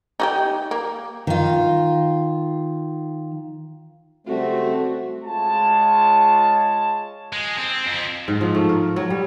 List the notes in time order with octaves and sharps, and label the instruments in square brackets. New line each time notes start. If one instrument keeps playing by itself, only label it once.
[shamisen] D#4 F#4 G4
A#3
[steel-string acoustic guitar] D#3 F4
[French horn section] C#3 G3 C4 [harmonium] A3 [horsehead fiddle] F#4
[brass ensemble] G#3 F4 C#5 A5
[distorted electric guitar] G#3
C4
F2
[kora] G#2
F3
A3
A#4
F#3
G3